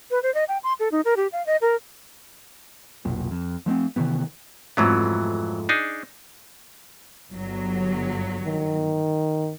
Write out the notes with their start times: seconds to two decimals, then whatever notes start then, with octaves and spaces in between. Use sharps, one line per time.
0.11 B4
0.23 C5
0.34 D#5
0.49 G5
0.64 C6
0.80 A4
0.92 D#4
1.05 A#4
1.17 G4
1.32 F5
1.46 D#5
1.62 A#4
3.05 F1 B1 A#2
3.31 F2
3.66 F3 A3 A#3 C4
3.96 C3 D#3 E3 B3
4.77 F2 G#2 E3 F#3 A3 B3
5.69 D4 D#4 G#4
7.33 G1 F#3
8.44 D#3